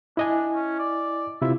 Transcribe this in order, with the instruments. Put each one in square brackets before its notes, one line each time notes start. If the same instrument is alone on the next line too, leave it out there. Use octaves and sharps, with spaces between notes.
[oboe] D4 [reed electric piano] E4 D#5 G#5
[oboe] C#4
D5
[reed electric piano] C3 E4 F4 [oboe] E5